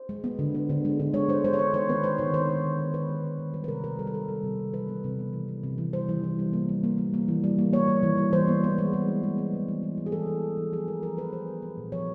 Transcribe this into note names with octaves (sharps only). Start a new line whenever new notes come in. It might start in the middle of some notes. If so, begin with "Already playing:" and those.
Already playing: C5
G#3
B3
D3
B3
D3
G#3
D3
G#3 C#5
G#3 C5
G#3 C5
C#5
G#3 C5
D#3 C5
B3 B4
G#3 C5
D#3 C#5
D#3 C5
D#3
D#3
B3
D#3 B4
G#3
D#3
D#3
G3 B4
B4
C3 A#4
C3 A#4
G3 A4
A#4
G3 A4
G3
C3
B3
E3 B4
B3
C3
B3
E3
B3
C3
E3
G3 C5
E3
E3
G3
A#3
G3
A#3
G3
A#3
E3
G3
A#3
A#3 C#5
A#3
E3
G3
E3 C5
B3
B3
G#3
G#3
E3
G#3
B3
E3
E3
E3
E3
G#4
E3 A4
B3
B3
E3
F3 G#4
G#3 A#4
F3 A#4
B3 B4
G#3 C5
B3
B3
A#2
F3 C#5